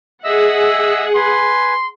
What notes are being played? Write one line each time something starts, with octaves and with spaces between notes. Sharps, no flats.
G#4 D#5 E5 F#5 E6
B4 G#5 C6